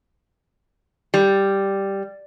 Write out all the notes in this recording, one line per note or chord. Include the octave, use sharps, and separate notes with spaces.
G3